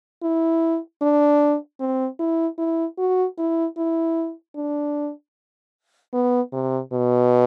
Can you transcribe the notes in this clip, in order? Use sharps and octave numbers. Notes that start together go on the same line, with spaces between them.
E4
D4
C4
E4
E4
F#4
E4
E4
D4
B3
C3
B2